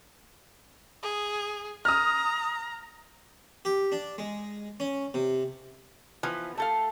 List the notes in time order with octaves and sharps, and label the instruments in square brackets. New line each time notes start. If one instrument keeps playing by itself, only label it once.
[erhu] G#4
[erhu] A#5 [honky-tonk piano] D#6 F6
[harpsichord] G4
D4
G#3
C#4
C3
[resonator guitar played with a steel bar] E3 F3 B3
A3 A4 F5